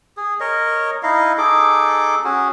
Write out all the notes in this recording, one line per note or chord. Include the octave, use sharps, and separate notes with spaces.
G#4
A#4 C#5 D#5
D#4 E4 D#5 F5
D#4 G#4 A4 D6
C#4 F#4 G#4